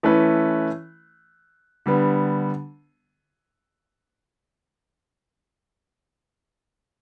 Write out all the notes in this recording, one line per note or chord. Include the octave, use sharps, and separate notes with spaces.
E3 A3 C#4 E4 B4
D3 G3 B3